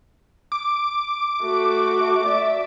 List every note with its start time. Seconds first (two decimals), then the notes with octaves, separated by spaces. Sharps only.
0.52 D6
1.42 A3 F#4
2.25 D5 E5